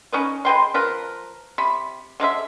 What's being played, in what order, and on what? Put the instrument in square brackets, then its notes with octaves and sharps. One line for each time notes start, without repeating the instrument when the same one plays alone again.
[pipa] C#4 D#4 B4
G#3 B4 G5 C6
F3 A#4 B4
C3 B5
D3 G#3 A#4 E5